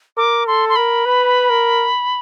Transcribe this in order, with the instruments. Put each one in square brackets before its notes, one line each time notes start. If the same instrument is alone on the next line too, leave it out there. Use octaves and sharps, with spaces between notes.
[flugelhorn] A#4 [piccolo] D6
[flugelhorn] A4 [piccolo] C6
[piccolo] C6
[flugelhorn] A#4 [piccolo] B5
[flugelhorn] B4
A#4